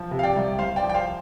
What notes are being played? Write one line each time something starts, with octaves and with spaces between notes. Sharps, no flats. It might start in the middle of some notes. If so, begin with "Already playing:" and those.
Already playing: F3
C3
F5
D5 G5
C2
C2 C5 F5
D5 G5
F3
G5
C5 F5